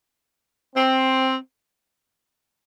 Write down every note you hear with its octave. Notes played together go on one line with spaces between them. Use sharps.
C4